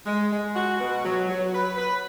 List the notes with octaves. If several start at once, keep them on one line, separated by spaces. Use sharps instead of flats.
G#3
G#3
F#4
B2
F#3
F#3
B4
B4